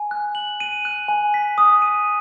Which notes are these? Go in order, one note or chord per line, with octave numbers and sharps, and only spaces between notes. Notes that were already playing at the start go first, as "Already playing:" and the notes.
Already playing: G#5
F#6
F#7
D#7
F#6
G#5
B6
D#6
D#7